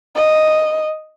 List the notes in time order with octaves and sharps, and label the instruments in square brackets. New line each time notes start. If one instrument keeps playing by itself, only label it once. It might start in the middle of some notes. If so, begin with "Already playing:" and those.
[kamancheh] D#5